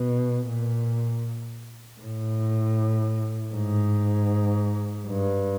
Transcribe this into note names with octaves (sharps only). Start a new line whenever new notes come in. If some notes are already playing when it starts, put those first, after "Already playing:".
Already playing: B2
A#2
A2
G#2
G2